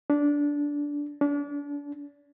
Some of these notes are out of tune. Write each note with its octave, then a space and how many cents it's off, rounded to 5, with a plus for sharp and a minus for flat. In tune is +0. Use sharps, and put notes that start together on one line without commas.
D4 -15
D4 -35